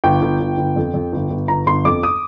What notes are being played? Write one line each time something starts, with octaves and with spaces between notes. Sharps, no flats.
G1 G5
G1
G1
G1
F2
F2
G1
G1
G1 A#5
G1 C6
F2 D6
D#6